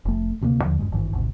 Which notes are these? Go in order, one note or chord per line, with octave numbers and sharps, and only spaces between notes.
F1 A3
D2 C3 G3 A#3
D#2 D3 F3
C#2 G2 G#3
G#1 G2 D#3 E3
G#1 D2 G#2 C3